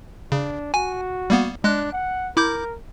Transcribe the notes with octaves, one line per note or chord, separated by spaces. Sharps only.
C#3 D4
F#4 G#5
G3 A#3 B3
G#3 D4 F#6
F#5
E4 A#4 D6 G6